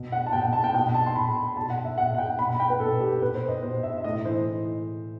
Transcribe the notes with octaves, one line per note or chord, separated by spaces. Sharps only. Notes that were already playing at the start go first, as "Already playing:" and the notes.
Already playing: B2
F#5
A5
B2 G5
A5
G5
B2 G5
A5
C6
B2 B5
B2 A5
F#5
E5
B2 F#5
F#5
G5
B2 B5
B5
G5
B4
B2 A4
G4
B2 B4
C5
D#5
B2 C5
E5
E5
A2 D#5
E3 C5